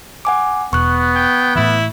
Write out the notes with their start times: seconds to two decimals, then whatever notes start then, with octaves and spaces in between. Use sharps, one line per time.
0.25 F#5 G#5 D6
0.73 E1 B3 C#6 F#6
1.15 G5
1.56 A2 E3 E4